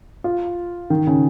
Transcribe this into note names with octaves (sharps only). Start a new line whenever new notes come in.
F4
D#3
C#3